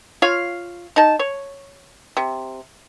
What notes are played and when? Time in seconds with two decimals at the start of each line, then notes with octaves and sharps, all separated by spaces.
0.22 F4 C#5 F5
0.96 D#4 A5
1.19 C#5
2.17 C3